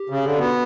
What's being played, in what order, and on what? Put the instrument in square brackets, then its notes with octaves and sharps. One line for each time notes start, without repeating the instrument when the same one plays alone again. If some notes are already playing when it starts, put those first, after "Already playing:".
Already playing: [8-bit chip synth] G4
[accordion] C#3
D3
[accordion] B3 [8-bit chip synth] F#4